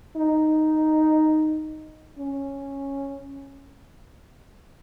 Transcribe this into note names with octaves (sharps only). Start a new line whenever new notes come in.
D#4
C#4